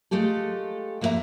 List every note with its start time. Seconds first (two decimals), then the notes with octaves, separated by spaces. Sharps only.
0.11 G#3 A3 F4 G4 A4
1.01 F2 A#3 D#4 F#4 E5 A#5